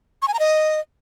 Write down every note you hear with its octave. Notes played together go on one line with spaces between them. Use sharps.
C#6
G#5
A#5
D#5